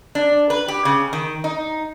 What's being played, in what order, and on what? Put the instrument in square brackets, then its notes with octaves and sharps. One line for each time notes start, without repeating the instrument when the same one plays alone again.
[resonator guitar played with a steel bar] D4
B4
G4
C#3
D#3
D#4